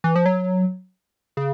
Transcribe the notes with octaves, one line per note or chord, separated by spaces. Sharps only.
E3
F3
F#3
C#3